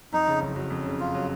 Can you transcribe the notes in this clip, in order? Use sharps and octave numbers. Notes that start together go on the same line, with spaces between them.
F2 D#4
C#3
F#1
F#3
F2
C#3
F#1 F4
F#3